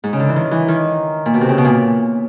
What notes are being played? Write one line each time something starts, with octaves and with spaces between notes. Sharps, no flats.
G#2
C#3
D3
E3
D#3
E3
D#3
A#2
B2
C3
C#3
B2
A#2